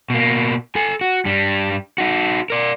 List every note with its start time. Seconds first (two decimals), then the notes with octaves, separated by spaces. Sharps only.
0.10 B2 A#3
0.76 A4 G#5
1.01 F#4
1.25 G2 G3
1.98 D#4 F#4
2.50 A#4 D5